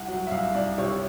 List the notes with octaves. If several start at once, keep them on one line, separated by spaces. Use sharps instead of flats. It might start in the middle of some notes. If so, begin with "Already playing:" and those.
Already playing: C2 F#5
F#3
E5
C2 F5
C2 D5
C3 C#5